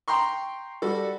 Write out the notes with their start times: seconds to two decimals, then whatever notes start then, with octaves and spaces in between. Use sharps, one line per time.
0.08 G5 A#5 C6 C#6
0.82 G3 F#4 A4